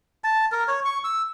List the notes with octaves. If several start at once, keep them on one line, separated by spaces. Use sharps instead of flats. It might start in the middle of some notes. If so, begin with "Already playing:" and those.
A5
A#4
C#5
C#6
E6